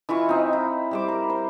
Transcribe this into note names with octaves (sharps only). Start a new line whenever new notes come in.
E3 E4 F4 C#6
C4 D#4
E4
G3 C5 D6
A#4
C5